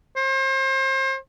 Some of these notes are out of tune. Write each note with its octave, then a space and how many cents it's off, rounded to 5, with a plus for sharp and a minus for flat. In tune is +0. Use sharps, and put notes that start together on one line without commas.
C5 +35